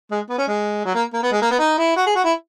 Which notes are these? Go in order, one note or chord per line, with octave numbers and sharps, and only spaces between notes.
G#3
B3
C#4
G#3
F#3
A#3
A#3
B3
G#3
A#3
B3
D#4
E4
F#4
G#4
F#4
E4